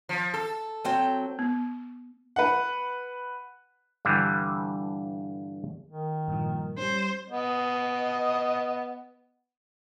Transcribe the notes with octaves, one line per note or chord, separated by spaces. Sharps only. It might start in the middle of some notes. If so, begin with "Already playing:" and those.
F3
A4
F#3 C4 G5
B3
B4 F#5
G2 D3 E3 G3
D#3
G2 A#2 F3
G3 C#4 C5
B3 D#5